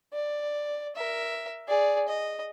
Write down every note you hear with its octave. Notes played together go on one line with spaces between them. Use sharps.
D5
A#4 E5
G#4 D5
D#5